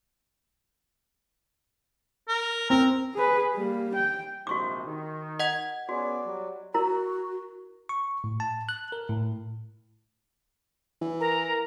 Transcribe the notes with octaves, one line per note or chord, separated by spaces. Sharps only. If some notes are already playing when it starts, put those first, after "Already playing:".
A#4
C4 A#4
G#4 B4
G3 A#3
G5
A#1 G#2 C3 F#4 C#6 D6
D#3
D#5 F#5 G#6
B3 C#4 F#4 G#4 D5
F#3 G3
E4 F#4 A#4 A#5
C#6
A2
A5
F#6
A#4
A2
E3
A#4 A#5